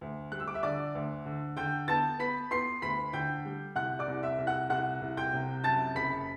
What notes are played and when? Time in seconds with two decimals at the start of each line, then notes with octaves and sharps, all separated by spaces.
0.01 D2
0.32 G3 F#6
0.40 E6
0.48 D6
0.54 E5 E6
0.63 D3 D5 D6
0.95 D2
1.26 D3
1.57 D3 G5 G6
1.88 B3 A5 A6
2.19 B3 B5 B6
2.51 B3 C6 C7
2.82 D2 B5 B6
3.13 D3 G5 G6
3.46 G3
3.76 C2 F#5 F#6
3.99 D5 D6
4.08 C2
4.23 E5 E6
4.38 C2
4.47 F#5 F#6
4.70 C2 F#5 F#6
5.02 C2
5.17 G5 G6
5.33 C3
5.64 F#2 A5 A6
5.95 F#1 B5 B6